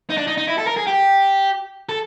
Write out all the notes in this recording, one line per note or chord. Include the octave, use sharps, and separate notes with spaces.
D#4
D4
D#4
D#4
E4
A4
A#4
G#4
G4
A4